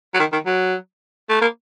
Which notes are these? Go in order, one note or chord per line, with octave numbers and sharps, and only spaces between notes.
F#3
D#3
D#3
F#3
A3
A#3